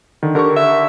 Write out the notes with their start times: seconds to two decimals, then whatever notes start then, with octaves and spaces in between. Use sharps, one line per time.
0.23 D3 D#3
0.35 D3 G4 A#4 C#6
0.56 E5